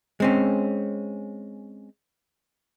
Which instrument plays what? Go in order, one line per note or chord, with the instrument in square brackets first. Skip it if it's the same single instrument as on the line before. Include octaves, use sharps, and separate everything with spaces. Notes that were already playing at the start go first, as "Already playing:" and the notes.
[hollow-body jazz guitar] G#3 C4 C#4